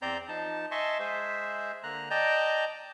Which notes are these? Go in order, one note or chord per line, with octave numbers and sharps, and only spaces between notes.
E2 C4 C5 D5 A#5 G6
F3 D#4 A5
D#5 E5 G#5 A5 C6 C#6
G#3 G#4 C5 E5
D3 A#3 A#5 F#6
D5 D#5 G5 A5 A#5 G6